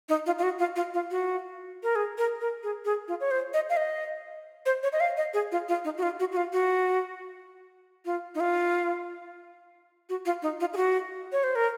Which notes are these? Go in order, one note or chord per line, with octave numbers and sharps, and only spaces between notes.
D#4
F4
F4
F#4
F4
F4
F4
F#4
A#4
G#4
A#4
A#4
G#4
G#4
F4
C#5
C5
D#5
F5
D#5
C5
C#5
D#5
F5
D#5
G#4
F4
F4
D#4
F#4
F4
F#4
F#4
F4
F#4
F4
D#4
F4
F#4
F4
D#4
F4
G#4
F#4
C#5
C5
A#4